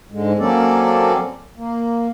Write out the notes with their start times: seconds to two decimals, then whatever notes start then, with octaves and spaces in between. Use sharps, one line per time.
0.12 G#2 D3 G#3
0.39 F#3 A#3 C4 C#4 A4 D5
1.57 A#3